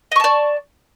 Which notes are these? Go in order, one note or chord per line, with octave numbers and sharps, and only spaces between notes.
D5 D#5 A5 C#6